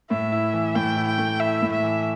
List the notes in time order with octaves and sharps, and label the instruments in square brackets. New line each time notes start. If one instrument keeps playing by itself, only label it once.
[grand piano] A2 [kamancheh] E5
[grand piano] E4
E3
[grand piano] A2 [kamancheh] G5
[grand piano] E4
[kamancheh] G5
[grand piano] A3
[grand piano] E4 [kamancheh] E5
[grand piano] A2
[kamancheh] E5
[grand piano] E3